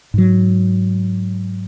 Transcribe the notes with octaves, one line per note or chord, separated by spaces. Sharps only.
G#2 F#3